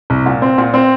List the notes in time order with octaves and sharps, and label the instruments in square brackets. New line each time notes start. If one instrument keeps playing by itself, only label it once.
[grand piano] C2
A#2
C4
A#2
C4